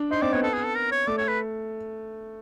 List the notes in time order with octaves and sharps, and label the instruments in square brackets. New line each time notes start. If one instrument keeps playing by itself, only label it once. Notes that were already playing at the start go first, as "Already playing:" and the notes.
Already playing: [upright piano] D4
[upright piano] D#4 [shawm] C5
[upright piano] C4 [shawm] D5
[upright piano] B3 [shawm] C#5
[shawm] A4
G#4
A4
A#4
C#5
[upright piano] A3 [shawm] D5
[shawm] C#5
B4